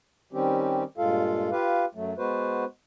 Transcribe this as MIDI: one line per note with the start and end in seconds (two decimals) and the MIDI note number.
0.33 0.84 51
0.33 0.84 55
0.33 0.84 60
0.33 0.84 61
0.33 0.84 67
0.98 1.50 43
0.98 1.50 46
0.98 1.50 56
0.98 1.50 65
0.98 1.50 69
0.98 1.50 77
1.51 1.85 65
1.51 1.85 67
1.51 1.85 71
1.51 1.85 77
1.95 2.14 42
1.95 2.14 54
1.95 2.14 57
2.18 2.65 56
2.18 2.65 59
2.18 2.65 66
2.18 2.65 71
2.18 2.65 72